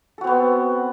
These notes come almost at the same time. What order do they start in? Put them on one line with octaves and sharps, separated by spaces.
A4 F#4 C4 B3